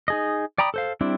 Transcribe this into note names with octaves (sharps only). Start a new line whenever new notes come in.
D#4 G#4 D#5
D5 G5 A#5 B5 D#6
A4 C5 F5
G3 C4 D4 E4